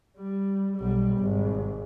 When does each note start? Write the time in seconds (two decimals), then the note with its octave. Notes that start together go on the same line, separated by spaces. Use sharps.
0.18 G3
0.77 B1 G3
1.19 G#1